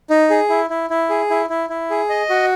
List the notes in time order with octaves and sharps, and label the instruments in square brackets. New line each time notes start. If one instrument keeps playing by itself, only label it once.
[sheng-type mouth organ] D#4
G#4
E4
E4
E4
G#4
E4
E4
E4
G#4
D#5
F#4